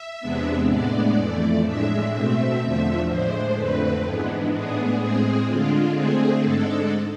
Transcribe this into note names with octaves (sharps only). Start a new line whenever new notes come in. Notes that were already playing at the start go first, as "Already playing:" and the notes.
Already playing: E5
E2 C3 G#3 B3 D4
A2 G#3 B3 D4 D5
F2 E3 A3
A2 G#3 D4 E5
B2 A3 C4 E5
E2 D3 F3 A3
A2 G#3 D4 C5
F2 D3 A3 C4 B4
G#2 E3 G#3 B3 D4
A2 G#3 B3 D4 G#4
A2 G#3 C4 G#4
D3 G#3 D4 F4
D3 A3 C4 G#4
G#2 G#3 D4 A4